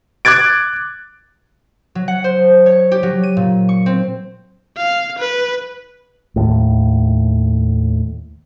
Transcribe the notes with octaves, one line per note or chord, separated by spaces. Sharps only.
D6 F#6 G#6 A6 D7
F#3
F#5
C5
C#5
G4
F#3
D#7
A#2
C#6
C4
F5
B4
D#2 A2